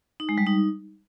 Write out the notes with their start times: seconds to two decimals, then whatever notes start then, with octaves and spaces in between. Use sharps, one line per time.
0.20 D#4
0.29 G#3
0.38 G3
0.47 D#4